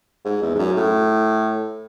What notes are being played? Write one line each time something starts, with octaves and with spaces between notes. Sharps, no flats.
G#2
E2
G#2
F#2
A2